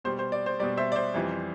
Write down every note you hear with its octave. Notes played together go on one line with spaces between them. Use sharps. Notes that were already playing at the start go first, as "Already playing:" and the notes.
B2 G3 C5
C5
D5
C5
B2 G3 D5
C5 E5
D5
C5
F2 E3 G3